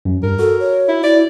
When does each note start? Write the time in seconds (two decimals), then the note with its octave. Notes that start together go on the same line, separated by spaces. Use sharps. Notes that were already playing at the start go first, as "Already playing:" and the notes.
0.05 F#2
0.23 G2 A#4
0.39 F#4 A4
0.60 C#5
0.88 E4
1.04 E4 D5